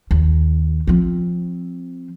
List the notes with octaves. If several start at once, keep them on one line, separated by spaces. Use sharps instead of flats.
D#2
F3 C4